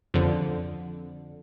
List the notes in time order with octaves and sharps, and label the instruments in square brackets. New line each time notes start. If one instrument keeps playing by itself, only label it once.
[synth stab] F2 D3